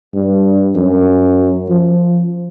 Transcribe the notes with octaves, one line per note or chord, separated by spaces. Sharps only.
G2
F#2
F3